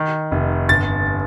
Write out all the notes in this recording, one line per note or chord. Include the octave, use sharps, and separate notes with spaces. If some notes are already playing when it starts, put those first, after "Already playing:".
Already playing: D#3
F1
G1 A6